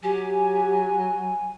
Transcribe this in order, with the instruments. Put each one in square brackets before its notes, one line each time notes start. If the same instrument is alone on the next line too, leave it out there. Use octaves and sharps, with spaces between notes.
[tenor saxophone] F#3 [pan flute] G4 [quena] G#5